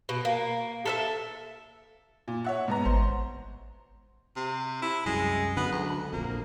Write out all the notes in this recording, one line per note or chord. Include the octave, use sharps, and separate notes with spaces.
B2
A#3
A4 A#4 E5
A#2
C#5 E5 F#5
G#2 B3 A#5
G#1 C5
C3
E4
C2 F#2 G#3
D3 F#3 G#3 B3
D2
A#1 F2 A#3